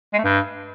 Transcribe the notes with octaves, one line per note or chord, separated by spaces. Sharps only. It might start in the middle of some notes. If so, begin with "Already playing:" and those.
G#3
A3
G2